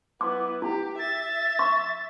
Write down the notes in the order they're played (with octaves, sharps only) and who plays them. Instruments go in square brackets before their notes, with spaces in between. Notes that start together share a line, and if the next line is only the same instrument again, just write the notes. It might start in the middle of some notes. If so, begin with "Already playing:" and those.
[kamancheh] B3 E4 [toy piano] D6
[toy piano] E4 [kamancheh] G4
[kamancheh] E5 [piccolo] A6
[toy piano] C#6